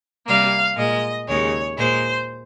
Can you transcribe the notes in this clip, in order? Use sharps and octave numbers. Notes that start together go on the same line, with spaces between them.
C3 G3 A#3 F5
A#2 G#3 D#5
D#2 C#3 G#3 C#5
A#2 G#3 C5